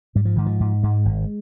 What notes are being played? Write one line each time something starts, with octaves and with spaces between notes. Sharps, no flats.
G#2 G3
F3
G#2 D#3
F3
G#2
G#2 G#3
G#1